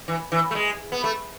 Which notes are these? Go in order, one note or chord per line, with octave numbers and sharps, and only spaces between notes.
E3
E3
A3
G#3
B3
A3